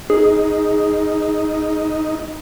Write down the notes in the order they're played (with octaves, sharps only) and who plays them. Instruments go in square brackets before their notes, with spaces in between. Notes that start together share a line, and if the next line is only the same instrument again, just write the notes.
[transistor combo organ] D#4 [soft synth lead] G#4